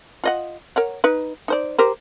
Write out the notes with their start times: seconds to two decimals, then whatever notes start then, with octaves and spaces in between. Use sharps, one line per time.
0.24 F4 D#5 F#5
0.76 A#4 C#5 F#5
1.04 D#4 B4
1.48 D#4 C5 D5
1.78 G4 A#4 C5